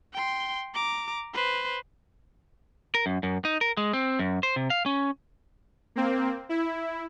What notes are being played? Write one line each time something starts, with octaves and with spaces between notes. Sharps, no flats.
G5 C6
A#5 D6
B4 C5
A#4
F#2
F#2
D#4
A#4
G#3
C4
F#2
C5
C3
F5
C#4
A#3 C4
E4